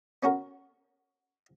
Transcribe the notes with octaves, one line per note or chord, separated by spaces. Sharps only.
B3 C#4 F#4 A#4